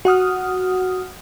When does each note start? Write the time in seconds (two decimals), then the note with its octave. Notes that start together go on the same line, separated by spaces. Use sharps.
0.05 F#4 F#5 D#6 F6